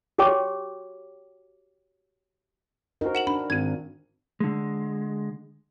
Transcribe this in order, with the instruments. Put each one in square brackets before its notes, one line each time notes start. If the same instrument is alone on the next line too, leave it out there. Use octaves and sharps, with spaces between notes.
[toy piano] F#4 G4 C#5 G5 D6
[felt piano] D#4 F#4 C5 [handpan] A#4
[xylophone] F#5 E7 F#7
[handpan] D4 [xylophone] B5
[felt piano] G#1 D#7 [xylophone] G#6
[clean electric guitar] D3 G#3